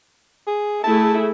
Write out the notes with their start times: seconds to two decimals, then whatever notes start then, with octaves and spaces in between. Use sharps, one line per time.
0.47 G#4
0.84 A3 E4 G#4 A5